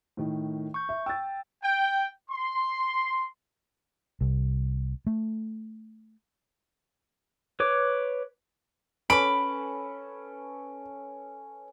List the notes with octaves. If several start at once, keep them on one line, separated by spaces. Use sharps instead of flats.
A2 D#3
C#6 G6
E5
G5 E6 A6
G5
C6
C2
A3
B4 C#5 D6
C#4 A4 B4 B5 D6 D7